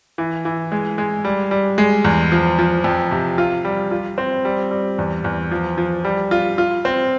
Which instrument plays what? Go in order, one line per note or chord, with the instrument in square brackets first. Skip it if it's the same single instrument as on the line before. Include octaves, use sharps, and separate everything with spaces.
[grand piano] E3
E3
G#3
G#3
G3
G3
G#3
E2
F3
F3
F2
C3
F4
G3
F4
C4
G3
G3
E2
E2
F3
F3
G3
F4
F4
C4